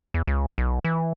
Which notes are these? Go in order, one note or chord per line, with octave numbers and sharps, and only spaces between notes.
E2
C#2
B1
E3